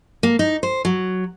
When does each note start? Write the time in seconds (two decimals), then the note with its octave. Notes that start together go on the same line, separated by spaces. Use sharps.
0.23 A#3
0.39 D#4
0.63 C5
0.85 F#3